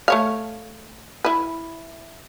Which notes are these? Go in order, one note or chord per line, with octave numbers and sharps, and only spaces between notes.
A3 C#5 F5
E4 B4